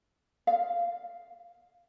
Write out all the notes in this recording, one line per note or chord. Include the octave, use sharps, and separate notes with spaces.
F5